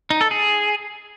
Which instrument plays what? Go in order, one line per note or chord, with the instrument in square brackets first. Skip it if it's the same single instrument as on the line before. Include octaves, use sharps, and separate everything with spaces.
[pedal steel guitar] D#4
A4
G#4